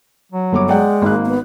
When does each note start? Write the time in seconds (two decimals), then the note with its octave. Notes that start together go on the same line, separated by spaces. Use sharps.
0.32 F#3
0.53 G1 C#5 D6
0.69 G#3 D5 F#5 G5
1.02 G#1 A#3 F#6
1.26 B3